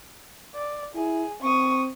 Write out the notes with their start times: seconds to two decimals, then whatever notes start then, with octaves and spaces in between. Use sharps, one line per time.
0.55 D5
0.95 E4 G#4
1.42 C4 C#6 D#6